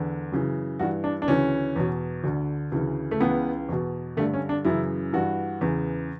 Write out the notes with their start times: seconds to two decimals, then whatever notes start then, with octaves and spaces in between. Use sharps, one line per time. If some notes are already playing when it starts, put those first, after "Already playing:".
Already playing: E2 D3
0.32 F#2 C#3 E3
0.79 G2 E3 F#4
1.04 D4
1.22 D4
1.28 D2 C#3 E3 C#4
1.76 E2 B2
2.24 D2 D3
2.72 D2 C#3 E3
3.11 A3
3.20 C#2 C#3 E3 B3
3.69 E2 B2
4.17 G2 D3 A3
4.33 C#4
4.49 D4
4.65 F#2 C#3 E3 E4
5.13 G2 E3 F#4
5.61 E2 C#3 E3